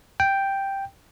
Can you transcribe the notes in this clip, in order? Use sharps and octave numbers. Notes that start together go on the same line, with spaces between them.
G5